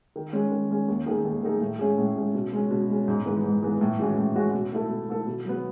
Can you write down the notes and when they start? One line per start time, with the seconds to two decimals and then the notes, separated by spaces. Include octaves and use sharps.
0.16 D#3
0.33 G#3 C#4
0.51 D#3
0.70 G#3 C#4
0.88 D#2
1.06 D#3 A3 D#4 G#4
1.25 D#2
1.43 D#3 A3 D#4 G#4
1.61 A2
1.79 G#3 C#4 G#4
1.98 A2
2.17 G#3 C#4 G#4
2.35 B2
2.52 G#3 C#4
2.71 B2
2.89 G#3 C#4
3.08 G#2
3.26 E3 G#3 B3 D#4
3.43 G#2
3.63 E3 G#3 B3 D#4
3.81 A2
3.99 E3 G#3 C#4 F#4
4.18 A2
4.35 E3 G#3 C#4 F#4
4.54 B2
4.72 A3 E4 A4
4.90 B2
5.09 A3 E4 A4
5.27 B2
5.45 F#3 B3